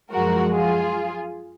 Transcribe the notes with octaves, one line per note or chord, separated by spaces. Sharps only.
F#2 F3 G#3 F#4 A#4
F4 G#4